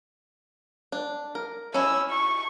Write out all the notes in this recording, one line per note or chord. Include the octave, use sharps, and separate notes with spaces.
D4
A#4
C#4 E4 E6
C#6